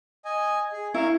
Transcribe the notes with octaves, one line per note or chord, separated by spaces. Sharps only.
D#5 G#5
G#4
E4 A#4 F5 C#6